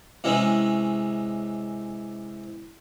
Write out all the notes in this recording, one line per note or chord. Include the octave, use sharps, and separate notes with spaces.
C3 E3 G#3 C#4